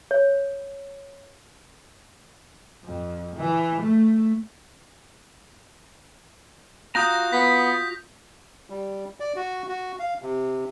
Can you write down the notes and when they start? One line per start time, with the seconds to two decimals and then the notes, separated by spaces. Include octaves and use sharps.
0.11 C#5
2.85 F2
3.36 E3
3.82 A3
6.95 F4 F#4 A#5 D#6 G6 A#6
7.33 B3 B6
8.70 G3
9.20 D5
9.36 F#4
9.69 F#4
9.99 F5
10.22 C3